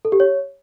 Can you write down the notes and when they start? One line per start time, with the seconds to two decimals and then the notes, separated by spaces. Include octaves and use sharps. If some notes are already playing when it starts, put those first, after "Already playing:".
0.05 A4
0.12 G4
0.20 C#5